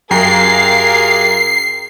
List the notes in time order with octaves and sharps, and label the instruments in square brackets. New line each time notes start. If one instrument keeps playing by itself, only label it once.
[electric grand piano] F#2 G5 A#5 [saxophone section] G4 G#4 [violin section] A#4 F5 [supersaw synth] C7